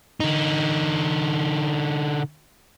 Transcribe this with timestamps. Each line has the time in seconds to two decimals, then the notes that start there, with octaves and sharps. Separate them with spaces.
0.20 D3 D#4